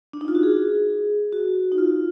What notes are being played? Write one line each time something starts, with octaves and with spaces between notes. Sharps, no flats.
D4
D#4
F4
F#4
G#4
F#4
D#4
F4